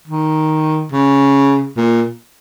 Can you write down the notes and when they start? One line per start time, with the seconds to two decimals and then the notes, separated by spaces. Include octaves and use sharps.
0.08 D#3
0.92 C#3
1.77 A#2